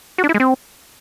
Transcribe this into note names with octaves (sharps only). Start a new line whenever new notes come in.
F#4
D4
E4
G#3
C4